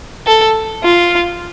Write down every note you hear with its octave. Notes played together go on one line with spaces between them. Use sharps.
A4
F4